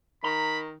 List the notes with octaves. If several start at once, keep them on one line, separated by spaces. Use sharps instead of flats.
D#3 A#5 B5